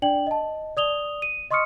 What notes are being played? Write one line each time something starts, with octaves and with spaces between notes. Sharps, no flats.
D4 D5 G5 F#7
D#5 A5
D5 D#6 F7 G7
D#7
D#5 C6 C#6 D#6 F6 C#7